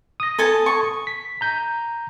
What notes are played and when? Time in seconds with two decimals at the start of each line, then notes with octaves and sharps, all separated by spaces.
0.20 D#6 A#6
0.39 A4 G#5 A5
0.66 C#6
1.07 B6
1.41 A#5 G6